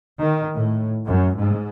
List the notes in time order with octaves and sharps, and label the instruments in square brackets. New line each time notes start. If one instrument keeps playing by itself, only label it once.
[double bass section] D#3
A2
F#2
G#2